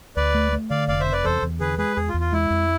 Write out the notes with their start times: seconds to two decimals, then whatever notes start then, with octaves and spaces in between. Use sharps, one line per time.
0.16 D2 B4 D5
0.34 A3
0.52 A3
0.70 D3 D5 F5
0.88 F1 D5 F5
1.00 C5 E5
1.07 C3
1.12 B4 D5
1.24 E2 A4 C5
1.42 E2
1.60 D3 G#4 B4
1.78 G#3 G#4 B4
1.96 E2 G#4
2.09 F4
2.14 E2
2.20 F4
2.32 G#3 E4
2.50 F2